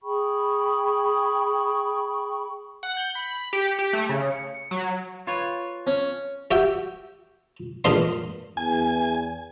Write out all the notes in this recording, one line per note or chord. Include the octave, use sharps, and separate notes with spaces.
G#4 G5 B5 C#6
F#5
G6
B5
G4
C#7
G4
A3
C#3
C#7
C#7
F#3
F4 B4 C#5
C#4
F#4 G4 E5 G5
E2 A#2 D4 A#4 D#5 C6
E2 G#5